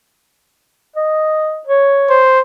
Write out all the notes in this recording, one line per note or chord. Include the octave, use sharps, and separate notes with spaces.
D#5
C#5
C5